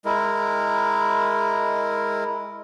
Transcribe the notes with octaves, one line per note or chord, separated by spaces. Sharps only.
G#3 E4 A#4